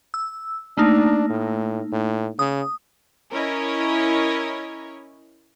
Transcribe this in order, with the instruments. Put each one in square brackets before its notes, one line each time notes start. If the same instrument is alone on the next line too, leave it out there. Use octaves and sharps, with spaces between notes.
[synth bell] E6
[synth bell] A3 A#3 D#4 [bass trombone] D4
[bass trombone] A2
A2
[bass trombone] C#3 [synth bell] D#6
[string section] C#4 E4 A#4 C#5 D#5